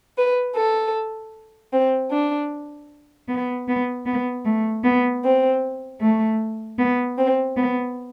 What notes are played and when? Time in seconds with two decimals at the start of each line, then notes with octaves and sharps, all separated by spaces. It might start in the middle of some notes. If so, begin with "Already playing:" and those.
0.17 B4
0.56 A4
1.72 C4
2.12 D4
3.28 B3
3.68 B3
4.06 B3
4.45 A3
4.84 B3
5.23 C4
6.01 A3
6.78 B3
7.18 C4
7.56 B3